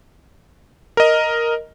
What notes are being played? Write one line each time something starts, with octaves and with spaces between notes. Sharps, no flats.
A#4 D#5